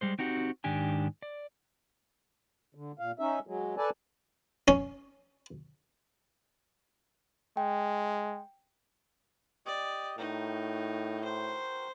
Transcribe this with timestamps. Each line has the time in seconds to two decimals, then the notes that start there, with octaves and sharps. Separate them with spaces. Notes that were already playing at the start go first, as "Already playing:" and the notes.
0.01 G3 G#3 C5
0.19 C4 D#4 F#4 G4
0.64 G#2 D#3 D4 G4 G#5
1.22 D5
2.75 D3
2.99 A#2 F5
3.19 C#4 D#4 E5
3.47 F#3 G#3
3.77 A4 B4 D5 G#5 A5
4.68 C#4
7.57 G#3 G5
9.66 G4 D5 D#5
10.18 A2 D#4 F#4 A#4 G5
11.24 C5